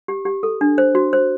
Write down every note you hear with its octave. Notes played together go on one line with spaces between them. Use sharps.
G4
G4
A4
D4
C5
F#4
C5